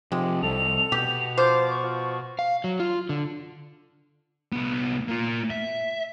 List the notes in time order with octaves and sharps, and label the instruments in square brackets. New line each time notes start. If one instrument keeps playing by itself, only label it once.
[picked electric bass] C3 F3 [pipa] G#3 [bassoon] G4
[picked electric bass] C2 [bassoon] A4 [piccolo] F7
[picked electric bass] B2 B3 [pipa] G4
[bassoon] F3 [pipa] C5 [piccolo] D6
[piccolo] C#6
[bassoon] F3
[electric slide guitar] F5
F#3
F4
D3
[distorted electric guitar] C2 B3
A#3 F4
E5